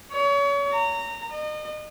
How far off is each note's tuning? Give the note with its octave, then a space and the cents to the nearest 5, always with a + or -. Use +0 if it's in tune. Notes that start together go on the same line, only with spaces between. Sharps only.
C#5 +35
A#5 -20
D#5 -35